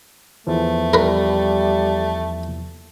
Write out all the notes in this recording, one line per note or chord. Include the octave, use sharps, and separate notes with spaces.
E2 E3 F3 A3
G3 A#4 B4